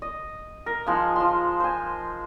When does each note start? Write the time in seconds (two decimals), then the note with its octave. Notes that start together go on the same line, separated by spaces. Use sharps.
0.02 D#5
0.66 A#4
0.86 F3 G#3 D#4 F5
1.16 F3 C6
1.60 C5 G#5